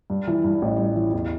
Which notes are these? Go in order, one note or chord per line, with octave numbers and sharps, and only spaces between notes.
G2
E3
G2
A1
G2
E3
E2